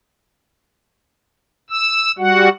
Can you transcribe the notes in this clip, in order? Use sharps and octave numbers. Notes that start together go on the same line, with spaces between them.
E6
G3 F#4 F#5